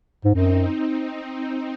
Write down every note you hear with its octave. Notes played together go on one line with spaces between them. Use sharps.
G#2
F#2 C4 D#4